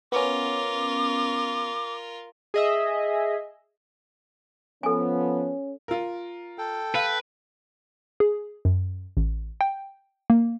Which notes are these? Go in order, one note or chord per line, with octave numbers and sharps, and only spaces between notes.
B3 C#4 F4 A#4 D6
G#4 D#5 E5
F3 B3 C#4 A4 G#5
F4 A#4
A4 G5
B4 F5
G#4
F#2
A1
G5
A#3